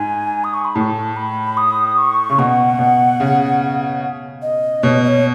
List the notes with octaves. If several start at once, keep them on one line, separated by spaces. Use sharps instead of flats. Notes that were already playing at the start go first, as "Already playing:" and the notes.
Already playing: G#2 G#5
D#6
C#6
B5
A2 A5
B5
D#6
C#6
C#3
B2 F#5
B2
C#3
D#5
B2 C#5
D#5
C#5